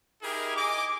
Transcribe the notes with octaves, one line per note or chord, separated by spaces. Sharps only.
D#4 E4 G4 G#4 A#4
D#5 G#5 D6